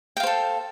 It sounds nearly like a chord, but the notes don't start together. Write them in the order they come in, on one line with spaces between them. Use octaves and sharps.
G5 F5 C5 A4